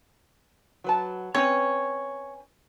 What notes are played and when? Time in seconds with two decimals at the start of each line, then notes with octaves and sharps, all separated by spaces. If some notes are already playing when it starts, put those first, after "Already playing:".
0.84 F#3 B4 A5
1.35 C4 C#4 B4 C#5